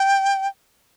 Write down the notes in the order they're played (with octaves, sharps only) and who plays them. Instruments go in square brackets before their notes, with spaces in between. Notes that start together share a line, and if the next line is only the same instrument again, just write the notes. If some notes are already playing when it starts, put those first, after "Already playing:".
Already playing: [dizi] G5